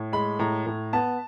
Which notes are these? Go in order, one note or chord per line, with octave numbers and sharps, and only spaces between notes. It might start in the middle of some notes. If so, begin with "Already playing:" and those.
Already playing: A2
G#3 B5
A2 A#5
A2
B3 A5